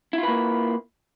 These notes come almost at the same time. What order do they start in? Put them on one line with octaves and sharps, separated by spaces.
E4 F4 B4 A#3